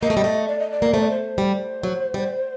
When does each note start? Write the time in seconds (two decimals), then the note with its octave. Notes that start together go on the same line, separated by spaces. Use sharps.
0.03 A#3 D#5
0.10 A3
0.17 G3
0.24 A3
0.48 D5
0.59 D#5
0.71 D5
0.82 A#3
0.93 A3 C5
1.01 D5
1.09 C5
1.38 G3
1.83 F#3
2.14 G3